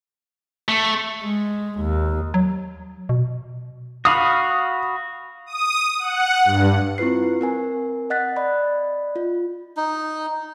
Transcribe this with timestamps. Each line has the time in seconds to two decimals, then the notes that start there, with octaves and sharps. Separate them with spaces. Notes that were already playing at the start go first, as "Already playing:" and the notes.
0.69 A3
1.23 G#3
1.80 D#2
2.34 F#3
3.09 B2
4.05 F#4 F5 B5 D#6
5.46 D#6
5.99 F#5
6.45 G2
6.98 C4 E4 F4 B4 C7
7.41 C4 A#4 G#5
8.10 D#5 F#5 F#6 A6 B6
8.36 D5 D#5 B5
9.16 F4
9.77 D#4